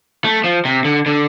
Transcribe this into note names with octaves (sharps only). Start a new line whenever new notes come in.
A3
F3
C3
D3
D3